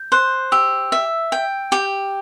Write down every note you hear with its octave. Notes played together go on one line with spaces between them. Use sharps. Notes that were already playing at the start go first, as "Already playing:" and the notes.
Already playing: G6
C5 F#6
G4 E6
E5
G5
G4